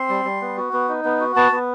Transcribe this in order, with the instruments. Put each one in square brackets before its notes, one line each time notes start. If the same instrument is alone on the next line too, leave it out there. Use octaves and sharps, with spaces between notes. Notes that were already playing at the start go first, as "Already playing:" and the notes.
Already playing: [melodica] C4 C6
G3
G3
B3
F#4
B3
D#4
B3
F#4
B3 A5
B3